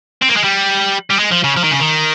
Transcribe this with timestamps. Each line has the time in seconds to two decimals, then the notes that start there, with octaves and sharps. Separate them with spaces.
0.22 C4
0.29 A#3
0.37 G#3
0.44 G3
1.10 G3
1.19 G#3
1.31 F3
1.44 C#3
1.57 F3
1.64 D#3
1.72 C#3
1.80 D#3